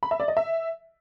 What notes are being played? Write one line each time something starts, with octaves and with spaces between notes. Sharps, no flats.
B5
E5
D5
D#5
E5